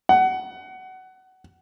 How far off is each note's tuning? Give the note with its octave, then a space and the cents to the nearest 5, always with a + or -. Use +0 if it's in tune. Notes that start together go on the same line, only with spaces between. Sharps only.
F#5 +20